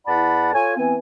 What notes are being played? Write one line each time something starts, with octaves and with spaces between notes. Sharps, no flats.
E2 E4 D5 F#5 A5 B5
F4 A4 C#5 G#5
E3 B3 C4 G#5